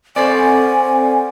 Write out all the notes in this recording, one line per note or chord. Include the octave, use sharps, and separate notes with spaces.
C4 A4 C5 D5 F#5 G#5